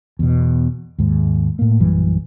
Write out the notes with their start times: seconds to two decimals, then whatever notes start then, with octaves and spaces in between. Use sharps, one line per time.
0.19 E2 B2
0.99 D#2 G#2
1.59 A2 A#3
1.80 A#1 F#2 E3 G3